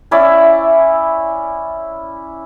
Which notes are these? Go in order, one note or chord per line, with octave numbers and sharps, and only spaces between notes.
C#4 E4 D5